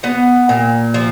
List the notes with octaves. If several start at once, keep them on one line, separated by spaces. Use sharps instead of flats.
B3 F#5
A#2
F3